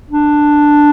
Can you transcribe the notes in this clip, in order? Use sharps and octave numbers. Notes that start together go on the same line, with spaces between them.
D4